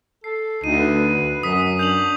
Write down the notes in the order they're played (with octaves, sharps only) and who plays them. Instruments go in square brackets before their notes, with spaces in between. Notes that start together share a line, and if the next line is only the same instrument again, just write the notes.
[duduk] A4 [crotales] C7
[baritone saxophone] D2 [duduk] D#4 [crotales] D#7
[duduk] B4
[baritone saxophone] F#2 [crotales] D#6 B6
[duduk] D4 [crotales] G6 F7 F#7